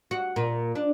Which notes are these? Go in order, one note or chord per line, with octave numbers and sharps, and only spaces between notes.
F#4
A#2
D4